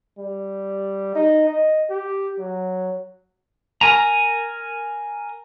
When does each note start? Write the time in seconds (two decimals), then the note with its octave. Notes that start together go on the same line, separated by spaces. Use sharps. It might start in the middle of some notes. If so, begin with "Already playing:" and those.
0.19 G3
1.15 D#4
1.49 D#5
1.90 G4
2.39 F#3
3.81 A#4 G#5 A#5